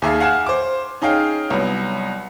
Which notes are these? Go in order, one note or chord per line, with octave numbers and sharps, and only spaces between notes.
D#2 G#4 E5 F5
F5 F#5 G#5 E7
C5 D6
C#4 D#4 G#4 F5 G5
C2 F#3 B3